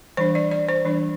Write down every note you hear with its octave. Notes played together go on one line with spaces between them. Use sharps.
E3 G3 D4 C5
D5
D5
C5
E3 G3 D4